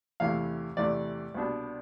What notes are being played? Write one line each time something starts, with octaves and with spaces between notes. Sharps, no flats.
E2 C3 E3 A3 F5
E2 C3 E3 A3 D5
C2 B2 B3 D4